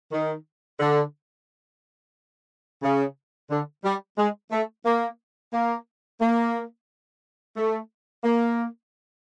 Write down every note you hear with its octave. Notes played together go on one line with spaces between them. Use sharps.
D#3
D3
C#3
D3
G3
G#3
A3
A#3
A#3
A#3
A3
A#3